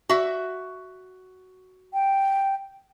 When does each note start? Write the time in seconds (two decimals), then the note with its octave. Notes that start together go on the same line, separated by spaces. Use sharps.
0.09 F#4 E5
1.94 G5